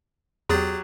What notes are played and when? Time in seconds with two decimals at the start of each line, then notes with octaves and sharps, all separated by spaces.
0.49 E2 F#3 G4 G#4 A6